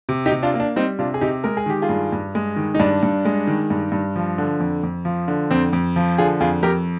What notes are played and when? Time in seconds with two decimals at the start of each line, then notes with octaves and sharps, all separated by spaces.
0.09 C3
0.26 D#4 G4
0.32 C3
0.43 D4 F4
0.54 A#3
0.60 D4
0.76 G3 C4 D#4
0.99 C3 D4 F4
1.14 G#4
1.21 C3 D#4 G4
1.44 G#3 A#4
1.57 G#4
1.66 D#3 G4
1.82 F4 G#4
1.89 G2
2.12 G2
2.35 G#3
2.56 D#3
2.75 D#4
2.80 G2 D4
3.03 G2
3.25 G#3
3.47 D#3
3.70 G2
3.92 G2
4.16 F3
4.38 D3
4.60 F2
4.83 F2
5.05 F3
5.28 D3
5.51 F2 C4
5.73 F2
5.96 F3
6.18 D3 F4 G#4
6.40 F2 F4 G#4
6.63 F2 G4 A#4